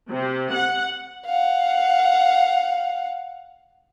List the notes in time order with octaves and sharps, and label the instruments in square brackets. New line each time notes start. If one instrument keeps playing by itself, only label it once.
[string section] C3
F#5
[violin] F5 F#5